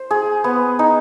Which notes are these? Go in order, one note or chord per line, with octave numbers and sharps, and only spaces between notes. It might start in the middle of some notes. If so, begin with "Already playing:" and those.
Already playing: C5
G#4
B3
D#4